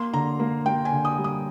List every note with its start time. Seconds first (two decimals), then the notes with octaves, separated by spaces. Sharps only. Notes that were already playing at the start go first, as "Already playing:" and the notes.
Already playing: A#3 C6
0.13 D3 A#5
0.39 A#3
0.65 A#3 G5
0.85 G#5
0.92 D3
1.05 D#6
1.18 G3
1.24 D#6